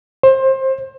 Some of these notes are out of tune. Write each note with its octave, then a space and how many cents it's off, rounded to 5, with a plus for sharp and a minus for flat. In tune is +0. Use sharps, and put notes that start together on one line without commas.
C5 +25